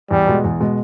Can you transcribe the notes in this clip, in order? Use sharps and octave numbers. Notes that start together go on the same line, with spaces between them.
E2 G3
B2 G#3
E2
B2 G#3